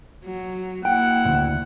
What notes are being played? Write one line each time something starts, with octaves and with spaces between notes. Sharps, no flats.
F#3
A#3 E4 F#5 G5
D2 G#2